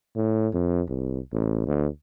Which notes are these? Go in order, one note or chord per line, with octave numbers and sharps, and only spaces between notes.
A2
F2
C2
A1
D2